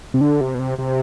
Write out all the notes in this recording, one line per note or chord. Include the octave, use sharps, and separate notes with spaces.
C3
D3
C3
B2
C3
C3